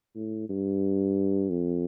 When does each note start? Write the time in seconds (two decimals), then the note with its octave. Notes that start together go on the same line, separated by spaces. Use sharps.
0.16 A2
0.49 G2
1.50 F2